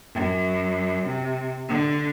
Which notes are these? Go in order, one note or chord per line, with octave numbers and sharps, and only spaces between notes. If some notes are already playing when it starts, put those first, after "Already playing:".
F#2
C3
D3